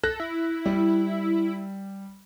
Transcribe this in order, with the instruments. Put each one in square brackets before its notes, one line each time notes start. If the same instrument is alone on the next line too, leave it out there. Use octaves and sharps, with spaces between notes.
[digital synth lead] A4 [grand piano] F#6 A#6
[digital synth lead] E4
[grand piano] G3